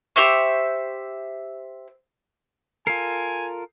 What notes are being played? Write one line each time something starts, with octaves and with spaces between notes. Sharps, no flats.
G4 C5 E5 C#6
F4 A4 A#4 G#5 C7